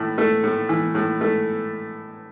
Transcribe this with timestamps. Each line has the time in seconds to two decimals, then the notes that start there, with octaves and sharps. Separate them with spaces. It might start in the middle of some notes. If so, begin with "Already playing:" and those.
Already playing: A2 E3
0.18 A3
0.44 A2
0.69 E3
0.95 A2
1.21 A3